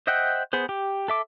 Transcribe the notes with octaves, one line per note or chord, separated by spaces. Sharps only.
C5 D#5 E5 F#5 G5
B3 G#4 C5
G4
A4 E5 D6